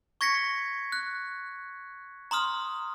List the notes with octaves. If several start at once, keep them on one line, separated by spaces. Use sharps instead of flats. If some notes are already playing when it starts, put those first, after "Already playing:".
C#6 G#6 A#6 B6 C#7
F#6
A#5 C6 D#6 F6